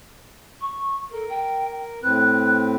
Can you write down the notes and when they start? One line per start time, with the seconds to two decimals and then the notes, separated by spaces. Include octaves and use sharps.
0.61 C#6
1.12 A4 A#4
1.30 G5
2.03 A2 C4 B4 F#6